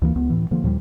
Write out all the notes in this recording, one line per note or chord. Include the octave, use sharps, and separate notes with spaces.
D2 E3 A3 A#3
C#2 B3
A2 E3
D3 F3 A#3
D#2 A#2 F3 G3